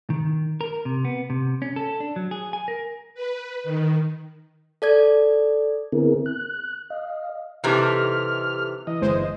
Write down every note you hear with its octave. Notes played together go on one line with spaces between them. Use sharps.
D#3
A#4
C3
B3
C3
C#4
A4
D4
F#3
G#4
G#5
A#4
B4
D#3
A4 D5 G#6
D3 B3 C4 E4 G#4 A#4
F#6
D#5 F5
C3 E3 D#4 G4 A4 F6
E3 D#5
G1 G#3 C5